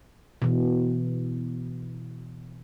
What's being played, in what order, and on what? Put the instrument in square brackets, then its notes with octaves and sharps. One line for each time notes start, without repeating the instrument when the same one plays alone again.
[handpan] B2 E3